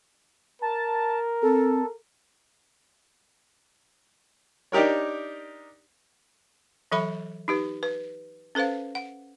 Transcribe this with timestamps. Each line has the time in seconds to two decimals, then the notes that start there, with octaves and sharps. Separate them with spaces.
0.62 A#4 A5
1.43 C4 A4
4.72 D4 D#4 G4 A#4 C#5
6.92 E3 F#3 A4 E5 B5
7.48 D#4 G4 B4
7.83 B4
8.55 C#4 A4 B4 C5 F5
8.95 F#5